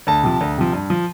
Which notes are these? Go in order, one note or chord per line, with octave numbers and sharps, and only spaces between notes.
D2 A5
C3 F3
D2
C3 F3
G2
F3